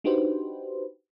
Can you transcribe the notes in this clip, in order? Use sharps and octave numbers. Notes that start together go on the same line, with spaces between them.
D4 D#4 F#4 G4 B4 C5